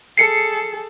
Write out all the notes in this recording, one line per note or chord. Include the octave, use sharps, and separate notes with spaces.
G#4 A4 C7 C#7